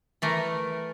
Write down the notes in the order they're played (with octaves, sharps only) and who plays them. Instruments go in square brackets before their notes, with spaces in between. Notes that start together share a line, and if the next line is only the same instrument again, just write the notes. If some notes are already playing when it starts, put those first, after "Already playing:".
[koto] E3 A3 A#4